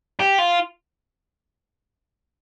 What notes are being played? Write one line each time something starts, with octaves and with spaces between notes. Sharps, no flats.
G4
F4